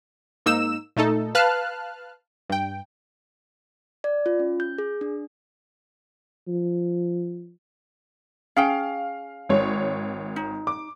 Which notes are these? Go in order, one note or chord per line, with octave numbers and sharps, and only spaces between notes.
G#2 A#3 D#4 E6 E7
A#2 A3 D#4 A4
B4 F5 A5 F6 F#6
G2 G5
D5
F4
C#4
G6
G#4
D4
F3
C#4 G#4 F5 G5
G#1 C#5
D#4
D6